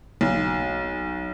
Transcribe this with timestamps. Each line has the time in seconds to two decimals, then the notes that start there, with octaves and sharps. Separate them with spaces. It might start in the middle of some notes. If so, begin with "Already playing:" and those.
0.21 B1